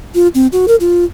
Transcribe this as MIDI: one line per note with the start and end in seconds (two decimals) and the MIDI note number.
0.15 0.28 65
0.35 0.47 60
0.52 0.66 66
0.68 0.76 70
0.80 1.05 65